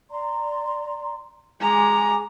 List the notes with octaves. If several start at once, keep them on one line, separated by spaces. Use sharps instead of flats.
D5 A#5 C6
G#3 G#4 G#5 A#5 D6